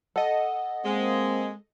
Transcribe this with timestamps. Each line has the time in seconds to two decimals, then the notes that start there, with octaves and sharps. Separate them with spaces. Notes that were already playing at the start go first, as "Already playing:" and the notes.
0.16 A4 D#5 F#5
0.85 G#3 A#3 C4